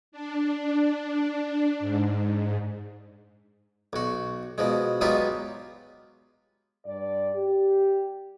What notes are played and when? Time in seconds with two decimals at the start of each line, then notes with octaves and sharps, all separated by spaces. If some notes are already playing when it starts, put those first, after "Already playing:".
0.12 D4
1.80 G#2
3.93 B1 F#4
4.58 B2 F3 G#3
5.01 F#3 G#3 B3 D#4 F4 G4
6.86 G2 D5
7.35 G4